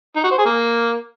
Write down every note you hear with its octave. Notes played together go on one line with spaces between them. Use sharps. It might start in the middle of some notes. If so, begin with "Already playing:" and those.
D#4
F#4
C5
G#4
A#3